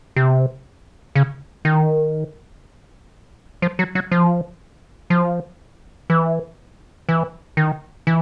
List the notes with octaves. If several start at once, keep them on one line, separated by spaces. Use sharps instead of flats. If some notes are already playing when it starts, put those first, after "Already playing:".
C3
C#3
D#3
F3
F#3
F#3
F3
F3
E3
E3
D#3
E3